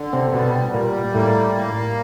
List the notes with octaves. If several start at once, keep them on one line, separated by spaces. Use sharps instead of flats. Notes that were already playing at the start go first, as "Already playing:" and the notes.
Already playing: D3
C3 C4
B2 G3 B3
A#2 G3 A#3
A2 A3 A#3
A#3